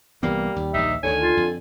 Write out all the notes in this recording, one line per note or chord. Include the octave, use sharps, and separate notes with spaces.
C2 E3 G3 A#3 B3
D#2
A#1 D#2 D#4 E5
D2 B2 D3 D#3 C#5 G#5
F4
F2